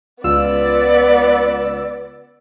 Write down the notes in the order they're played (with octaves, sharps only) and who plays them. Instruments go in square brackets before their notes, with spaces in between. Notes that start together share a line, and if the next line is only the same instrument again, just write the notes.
[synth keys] C#2 F4 E6 [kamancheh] B3 D5